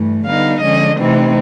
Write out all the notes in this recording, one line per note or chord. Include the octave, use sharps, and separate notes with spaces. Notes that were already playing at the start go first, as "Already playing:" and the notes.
Already playing: G2 E3 A3
D3 G3 B3 D#4 F5
D3 F3 G#3 C#4 D#5
C3 E3 A3 C4 D#4